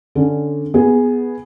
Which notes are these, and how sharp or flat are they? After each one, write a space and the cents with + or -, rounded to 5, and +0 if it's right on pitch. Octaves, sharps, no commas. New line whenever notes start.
D3 +0 C#4 +0
B3 +0 G#4 +0